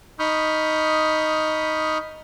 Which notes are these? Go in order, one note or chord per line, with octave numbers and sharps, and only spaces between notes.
D#4 B5 C#6 D#6 F6 G6